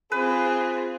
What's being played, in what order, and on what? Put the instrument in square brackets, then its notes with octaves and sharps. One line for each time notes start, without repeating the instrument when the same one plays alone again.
[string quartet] C4 F4 [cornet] G#4 [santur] B4